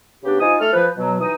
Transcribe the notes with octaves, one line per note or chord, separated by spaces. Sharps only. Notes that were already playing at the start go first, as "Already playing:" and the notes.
C#3 B3 D4 G4
F3 D#4 F4 G#5 D#6
A3 A4 F6
F3 B4
B2 F#3
E3 D#4 D#6